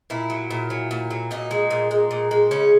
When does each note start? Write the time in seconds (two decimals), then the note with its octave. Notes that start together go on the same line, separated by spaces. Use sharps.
0.10 A#2 E4
0.30 F#3
0.51 A#2
0.70 F#3
0.91 A#2
1.10 F#3
1.31 A#2 D#4
1.51 G#3
1.71 A#2
1.91 G#3
2.11 A#2
2.31 G#3
2.51 C#3 C#4